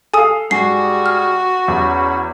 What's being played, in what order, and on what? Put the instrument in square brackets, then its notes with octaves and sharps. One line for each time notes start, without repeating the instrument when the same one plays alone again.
[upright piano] A4 F5 [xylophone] G#5 D#6
[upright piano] G#2 G#5 [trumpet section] G3 G#4 [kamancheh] F#4 [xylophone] C7
[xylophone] F6
[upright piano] E2 [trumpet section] C#4 B5